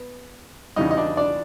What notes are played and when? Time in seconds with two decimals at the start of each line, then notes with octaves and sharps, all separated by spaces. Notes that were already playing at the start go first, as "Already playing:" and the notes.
Already playing: B3
0.76 E2 C#3 E3 G3 D#4 D#5
0.91 D#5
0.97 D4 D5
1.17 D4 D5